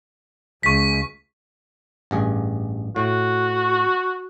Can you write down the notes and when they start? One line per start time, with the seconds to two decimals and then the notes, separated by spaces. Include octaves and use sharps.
0.63 C#2 C#6 B6
2.11 A1 G2 G#4
2.96 A2 F#4